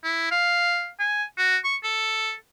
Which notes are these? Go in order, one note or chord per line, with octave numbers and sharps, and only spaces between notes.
E4
F5
G#5
F#4
C#6
A4